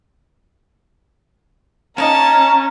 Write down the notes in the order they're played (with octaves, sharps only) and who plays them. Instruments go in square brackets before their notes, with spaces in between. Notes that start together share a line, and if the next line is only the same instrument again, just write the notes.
[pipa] A#3 D#4 D#5 [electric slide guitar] C#4 [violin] A5 [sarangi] A#5